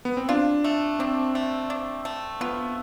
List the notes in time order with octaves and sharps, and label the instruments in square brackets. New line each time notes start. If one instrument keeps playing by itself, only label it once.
[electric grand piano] B3
C4
[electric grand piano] D4 [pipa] F4
[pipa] A3
[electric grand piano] C4 [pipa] D4
[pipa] A3
D4
A3
[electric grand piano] B3 [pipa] F4